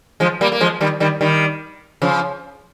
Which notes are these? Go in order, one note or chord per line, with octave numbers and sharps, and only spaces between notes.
F3 G#3
G3 A#3
A#3
F3 G#3
D#3 G3
D#3 G3
D#3 G3
C#3 F3